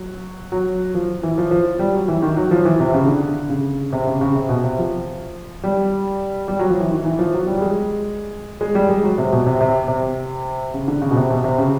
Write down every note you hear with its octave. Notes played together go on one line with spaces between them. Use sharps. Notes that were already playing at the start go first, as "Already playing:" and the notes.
Already playing: F#3
F#3
F3
E3
F3
F3
G3
F#3
E3
D#3
F#3
F3
E3
C3
C#3
D3
C#3
C3
C#3
C#3
C3
B2
C3
F3
G3
G3
F#3
F3
E3
D#3
E3
F3
F#3
G3
G3
G#3
G#3
G3
G#3
F#3
C3
B2
C3
C3
C3
C#3
D3
C#3
B2
C3
B2
C3
C#3